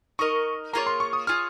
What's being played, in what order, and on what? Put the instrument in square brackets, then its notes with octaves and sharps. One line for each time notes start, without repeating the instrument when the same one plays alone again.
[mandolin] D#4 A#4 D#5 [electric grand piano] C#6
[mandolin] A#3 F4 G#4 C#5 [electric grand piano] A#5
[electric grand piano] C6
C#6
D#6
[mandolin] F4 G#4 C#5 [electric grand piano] F6